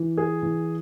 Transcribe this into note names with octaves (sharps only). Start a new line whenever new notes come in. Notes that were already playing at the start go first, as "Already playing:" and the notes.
Already playing: E3
G#4
E3